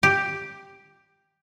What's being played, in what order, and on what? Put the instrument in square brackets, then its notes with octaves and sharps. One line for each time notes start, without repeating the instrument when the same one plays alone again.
[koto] G4